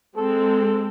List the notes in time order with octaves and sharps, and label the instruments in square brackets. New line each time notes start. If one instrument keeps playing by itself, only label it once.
[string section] G#3 C4 [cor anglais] A4